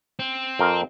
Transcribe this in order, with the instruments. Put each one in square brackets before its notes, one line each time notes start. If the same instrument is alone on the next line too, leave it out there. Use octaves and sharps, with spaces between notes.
[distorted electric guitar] C4
[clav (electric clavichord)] F2 A#4